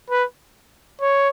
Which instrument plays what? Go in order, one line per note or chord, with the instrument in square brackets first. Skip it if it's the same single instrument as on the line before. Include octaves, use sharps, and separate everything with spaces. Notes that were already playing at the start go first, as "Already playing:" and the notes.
[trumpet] B4
C#5